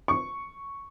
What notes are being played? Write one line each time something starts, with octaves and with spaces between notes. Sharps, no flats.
C#6